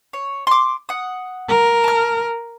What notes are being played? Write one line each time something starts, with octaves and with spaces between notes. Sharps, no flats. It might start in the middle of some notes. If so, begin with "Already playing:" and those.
C#5
C6 D6
F#5 D#6
A#4
A5 F6